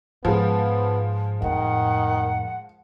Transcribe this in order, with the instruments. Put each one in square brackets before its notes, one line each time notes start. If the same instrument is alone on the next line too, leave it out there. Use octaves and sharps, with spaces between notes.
[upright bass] G#2 [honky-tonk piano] F3 G#3 [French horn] B3
[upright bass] F2 A2 [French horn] D#3 [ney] F#5